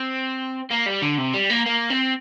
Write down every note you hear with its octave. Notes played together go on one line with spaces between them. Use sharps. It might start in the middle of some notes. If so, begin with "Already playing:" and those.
Already playing: C4
A#3
G3
D3
C3
G3
A#3
A#3
C4